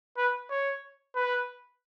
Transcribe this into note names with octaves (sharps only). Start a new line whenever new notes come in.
B4
C#5
B4